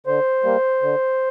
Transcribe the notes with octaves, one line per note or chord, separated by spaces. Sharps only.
D3 C5
G3 A#3
D3